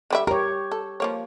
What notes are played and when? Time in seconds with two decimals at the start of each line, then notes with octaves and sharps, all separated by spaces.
0.10 D3 G3 E5
0.27 G4 A#4 C#5
0.72 A4
1.00 F3 A#3 C#5